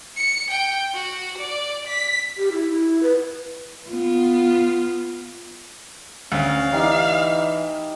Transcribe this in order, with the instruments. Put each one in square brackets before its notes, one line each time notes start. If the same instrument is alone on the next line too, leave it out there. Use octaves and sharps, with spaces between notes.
[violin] C#7
G5
F#4
D5
B6
[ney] G4
E4
E4
B4
[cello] B3 F4
[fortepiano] D2 [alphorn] C#4 [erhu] F5
[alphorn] E3 [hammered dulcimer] D#4 G4 D5